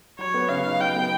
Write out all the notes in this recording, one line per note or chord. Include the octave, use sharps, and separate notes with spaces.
F#3 C#5
B3
C#3 F5
D#4
F#3 G5
B3